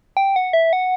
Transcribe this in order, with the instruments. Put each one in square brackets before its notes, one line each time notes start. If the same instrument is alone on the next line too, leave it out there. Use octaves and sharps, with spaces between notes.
[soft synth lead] G5
F#5
E5
F#5